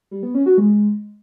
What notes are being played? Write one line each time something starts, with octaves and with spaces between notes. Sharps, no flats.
G3
B3
C#4
F#4
G#3